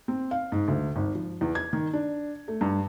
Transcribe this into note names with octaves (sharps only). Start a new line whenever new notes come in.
C4
F5
G#2
D2
G#1
F3
E2
G#6
D#3
D4
A3
G2